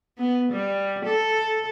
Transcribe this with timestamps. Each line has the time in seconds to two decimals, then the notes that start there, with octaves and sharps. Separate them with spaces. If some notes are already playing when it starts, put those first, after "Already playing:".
0.18 B3
0.52 G3
1.05 A4